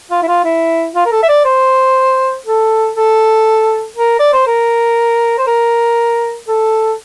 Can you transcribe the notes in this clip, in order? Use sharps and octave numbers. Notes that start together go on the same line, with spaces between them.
F4
E4
F4
E4
F4
A#4
A4
E5
D5
C5
A4
A4
A#4
D5
C5
A#4
C5
A#4
A4